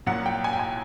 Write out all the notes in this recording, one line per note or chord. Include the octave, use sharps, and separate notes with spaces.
C2 A#2 F#3 F#5
G5
G#5
G5
G#5